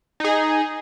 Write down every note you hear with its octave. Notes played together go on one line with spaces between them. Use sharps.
D#4 G#4